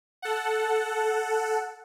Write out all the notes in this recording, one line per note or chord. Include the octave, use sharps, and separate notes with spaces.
A4 F#5